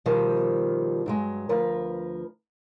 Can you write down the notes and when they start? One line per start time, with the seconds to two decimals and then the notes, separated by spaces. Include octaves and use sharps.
0.06 B2 D#3 F3 G3
1.06 G2 F#3 G#3
1.49 D2 F3 A#4 B4